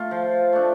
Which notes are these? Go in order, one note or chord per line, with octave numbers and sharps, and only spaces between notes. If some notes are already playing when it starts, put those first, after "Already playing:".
Already playing: A3 F4
F3
A3 D4